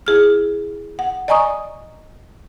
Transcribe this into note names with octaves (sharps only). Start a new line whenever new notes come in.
E4 G#4 F6
F#5
D5 D#5 G#5 A#5 C#6 D#6